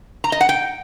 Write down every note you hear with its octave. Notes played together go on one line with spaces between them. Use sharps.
A#5
D#5
F#5
G5